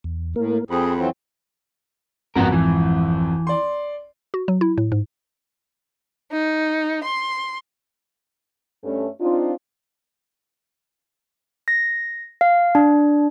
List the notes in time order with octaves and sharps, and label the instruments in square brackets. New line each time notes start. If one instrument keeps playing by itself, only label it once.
[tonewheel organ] E2
[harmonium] A2 [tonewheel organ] A#3 A#4
[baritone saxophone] F2 [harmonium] C4 G#4 [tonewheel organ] B5
[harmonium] E3 F#3 C4
[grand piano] G#1 F2 [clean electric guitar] B3 F#4 A#4
[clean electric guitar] E3
[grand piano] D5 C6
[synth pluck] F#4
F#3
E4
A2
G#2
[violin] D#4
C6
[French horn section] G2 A3 C#4
C4 D4 D#4 F4
[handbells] A#6
F5
D4